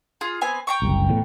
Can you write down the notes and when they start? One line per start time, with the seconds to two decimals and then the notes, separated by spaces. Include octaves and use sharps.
0.21 F4 G#4
0.41 B3 C4 G#5
0.67 G5 A#5 C#6
0.82 F#1 C2
1.09 E2 A2